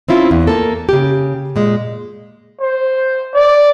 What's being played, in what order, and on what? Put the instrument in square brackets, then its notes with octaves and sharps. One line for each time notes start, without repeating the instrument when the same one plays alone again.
[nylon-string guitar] C4 C#4 E4 F4
E2
A#3 A4
C#3 G4
A#2 G#3
[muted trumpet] C5
D5